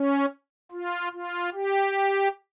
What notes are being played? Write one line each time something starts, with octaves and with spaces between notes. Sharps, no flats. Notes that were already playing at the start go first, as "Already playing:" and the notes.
Already playing: C#4
F4
F4
G4